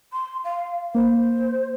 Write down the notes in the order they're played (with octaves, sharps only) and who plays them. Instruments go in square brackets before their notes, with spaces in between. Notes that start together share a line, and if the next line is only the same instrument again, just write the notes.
[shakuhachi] C6
F5
[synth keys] A#3 [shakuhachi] C5